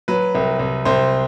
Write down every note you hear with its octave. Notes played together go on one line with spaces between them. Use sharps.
F#3 B4
C2
C2
C2 C5